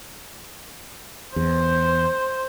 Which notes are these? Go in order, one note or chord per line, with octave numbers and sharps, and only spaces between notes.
E2 C5